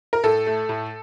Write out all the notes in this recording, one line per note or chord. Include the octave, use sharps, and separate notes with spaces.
A#4
A2 A4
A3
A2